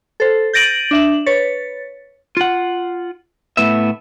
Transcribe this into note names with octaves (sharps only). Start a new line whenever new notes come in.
A4 C5
G6 A6 A#6 D7 D#7 F#7
D4 E5 F#7
B4 C#5 A6
F4 F#5
A2 B3 E5